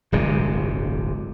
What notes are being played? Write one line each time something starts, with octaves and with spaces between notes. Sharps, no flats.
D1 G1 C3 G#3